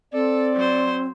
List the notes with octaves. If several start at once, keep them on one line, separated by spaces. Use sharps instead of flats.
C4 A4 D5
F#3 C5